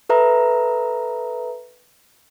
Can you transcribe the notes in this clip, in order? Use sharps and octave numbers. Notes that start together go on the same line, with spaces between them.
A4 B4 E5 A#5